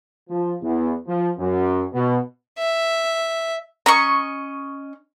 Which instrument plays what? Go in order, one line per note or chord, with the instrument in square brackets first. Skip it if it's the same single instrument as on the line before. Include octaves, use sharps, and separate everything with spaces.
[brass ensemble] F3
E2
F3
F#2
B2
[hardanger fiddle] E5
[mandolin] C#4 D#5 C#6 [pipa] A#5